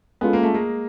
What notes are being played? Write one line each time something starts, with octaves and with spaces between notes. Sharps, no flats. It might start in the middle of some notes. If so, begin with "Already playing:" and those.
G#3 B3 C#4 F4 A4
A#3
A3
G#3 A#3